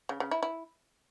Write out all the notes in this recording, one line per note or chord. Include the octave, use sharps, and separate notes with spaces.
C#3
C#3
E4
E4